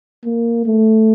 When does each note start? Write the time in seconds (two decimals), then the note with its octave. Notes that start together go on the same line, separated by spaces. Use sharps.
0.25 A#3
0.66 A3